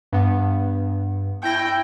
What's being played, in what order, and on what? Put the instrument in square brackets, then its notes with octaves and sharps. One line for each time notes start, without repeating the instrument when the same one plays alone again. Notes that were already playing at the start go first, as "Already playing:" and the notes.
[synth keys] G2 B3
[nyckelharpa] E4 [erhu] G5 [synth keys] G6 A#6